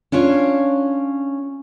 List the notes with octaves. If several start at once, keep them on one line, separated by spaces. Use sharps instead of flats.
C#4 D4 F4 C#5